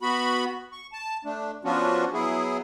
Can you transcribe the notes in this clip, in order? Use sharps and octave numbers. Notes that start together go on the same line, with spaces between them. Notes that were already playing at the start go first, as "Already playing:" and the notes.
B3 F#4 B5
C#6
A5
A3 D4
F3 B3 C#4 D4 F4 F#4
F#3 B3 E4 G#4